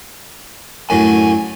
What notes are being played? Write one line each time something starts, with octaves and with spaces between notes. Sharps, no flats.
F#2 A2 D3 G#5